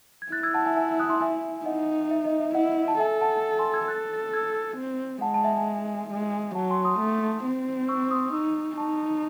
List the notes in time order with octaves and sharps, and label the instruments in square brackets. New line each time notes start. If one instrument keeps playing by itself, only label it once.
[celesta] G#6
[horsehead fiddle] E4 [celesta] F#6 A6
[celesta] E6 G#6
F#5 A5
E5 G#5
E5 G#5
D#6 F#6
C6 D#6
E5 G#5
G#5
[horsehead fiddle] D#4 [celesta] D#5 F#5
[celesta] E5
D#5
E5
[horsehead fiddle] E4 [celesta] D#5 F#5
[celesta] A5
[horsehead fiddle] A4 [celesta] E5 G#5
[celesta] F#5 A5
G#5 C6
E6 G#6
[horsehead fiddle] A4 [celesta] F#6 A6
[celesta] E6 G#6
[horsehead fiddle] C4
[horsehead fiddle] G#3 [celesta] F#5 A5
[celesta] A5
E5 G#5
[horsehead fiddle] G#3
[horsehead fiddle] F#3 [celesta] F#5 A5
[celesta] G#5 C6
C6 D#6
[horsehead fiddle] A3
C4
[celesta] C#6 E6
C6 D#6
[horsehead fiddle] D#4 [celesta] C#6 E6
[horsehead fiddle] D#4 [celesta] A5 C#6